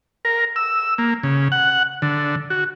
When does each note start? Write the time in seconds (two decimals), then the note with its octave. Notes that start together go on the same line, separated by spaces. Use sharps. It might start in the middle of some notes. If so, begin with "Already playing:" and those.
0.25 A#4
0.56 E6
0.98 A#3
1.23 C#3
1.52 F#5
2.02 D3
2.50 F#4